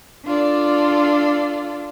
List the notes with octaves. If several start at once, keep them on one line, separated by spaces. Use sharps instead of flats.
D4 F4 A4 D5